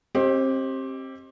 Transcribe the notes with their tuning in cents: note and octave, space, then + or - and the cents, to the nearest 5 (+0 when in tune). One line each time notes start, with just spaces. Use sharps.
C4 +30 G4 -10 D#5 +0